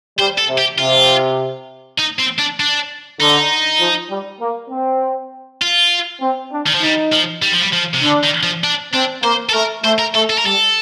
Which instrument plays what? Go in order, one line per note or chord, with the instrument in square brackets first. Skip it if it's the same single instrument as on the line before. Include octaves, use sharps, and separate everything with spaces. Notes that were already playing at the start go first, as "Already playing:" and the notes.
[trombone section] G3 [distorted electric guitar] C5
[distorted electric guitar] A4
[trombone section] C3
[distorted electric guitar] G4
[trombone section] C3 [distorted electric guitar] F4
[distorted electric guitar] D#4
C4
D4
D4
[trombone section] D3 [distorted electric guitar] D#4
[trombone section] F3
G3
A#3
C4
[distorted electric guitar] F4
[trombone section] C4
D4
[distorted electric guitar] D#3
F3
[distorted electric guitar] G3 [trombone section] D#4
[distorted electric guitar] F3
G3
F3
G3
F3
C3
[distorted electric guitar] D3 [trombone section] D4
[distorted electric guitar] D#3
F3
D4
[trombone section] C4 [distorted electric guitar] D4
[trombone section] A#3 [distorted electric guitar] C5
[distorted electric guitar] A4
[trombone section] A3 [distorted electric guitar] A#4
[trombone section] A3 [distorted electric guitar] C5
[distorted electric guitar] A#4
[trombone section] A3 [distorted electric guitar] A4
[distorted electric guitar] A4
A#4
[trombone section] G3 [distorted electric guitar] A4